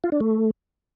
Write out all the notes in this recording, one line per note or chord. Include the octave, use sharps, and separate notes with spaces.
F4
D4
A3